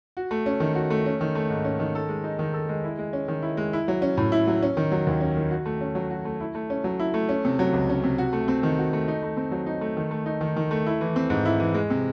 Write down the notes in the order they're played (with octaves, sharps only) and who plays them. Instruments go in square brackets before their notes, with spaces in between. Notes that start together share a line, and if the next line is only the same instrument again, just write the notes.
[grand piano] F#4
A3
C#4
D#3
F#4
A3
C#4
D#3
A3
G#2
C#4
D#3
A4
G#3
D#4
D#3
A4
G#3
E4
G#3
C#4
D#3
E4
G#3
E4
F#3
C#4
A2
E4
F#3
C#4
D#3
F#3
D#2
C#4
D#3
F#4
A3
C#4
F#3
F#4
A3
E4
A3
C#4
F#3
E4
A3
C#4
C3
F#3
C#2
C#4
C3
F#4
A3
C4
D#3
F#4
A3
D#4
A3
C4
F#3
D#4
A3
D#3
A3
D#4
D#3
D#3
A3
E4
E3
C4
G#2
E4
E3
G#3
C3